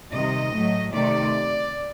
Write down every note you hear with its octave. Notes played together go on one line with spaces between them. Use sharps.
C3 D#3 G3 D#5
A2 F#3 A3
C3 D#3 A3 D5